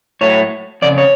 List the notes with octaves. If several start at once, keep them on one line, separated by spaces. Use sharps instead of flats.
A2 F#3 A3 C#5
F2 C#3 D5
C#5